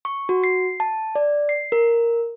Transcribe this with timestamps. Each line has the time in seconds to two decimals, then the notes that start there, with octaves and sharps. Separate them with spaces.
0.05 C#6
0.29 F#4
0.44 C7
0.80 A5
1.15 D5
1.49 C7
1.72 A#4